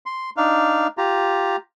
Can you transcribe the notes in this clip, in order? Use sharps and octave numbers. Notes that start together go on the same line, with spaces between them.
C6
D4 D#4 F5
F4 G4 A#5